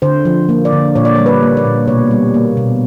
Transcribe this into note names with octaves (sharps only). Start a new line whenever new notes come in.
D3 C5
F3
A#3
D5
D3
A#2 C#5
D5
C#5
G3
B4
A#3
D5
A#2
B2 C#5
G3
A#3
B2